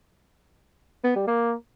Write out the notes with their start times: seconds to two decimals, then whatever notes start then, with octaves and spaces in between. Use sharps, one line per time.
1.04 B3
1.16 G3
1.27 A#3